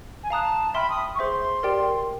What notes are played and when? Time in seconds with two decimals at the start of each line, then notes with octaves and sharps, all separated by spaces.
0.23 G#5
0.30 F5 A5 A#5 D#6 F#6
0.74 E5 G5 B5 C6 F6
0.90 D#6
1.15 C#6
1.19 G#4 C5 E5 C6
1.63 G4 A#4 D5 G5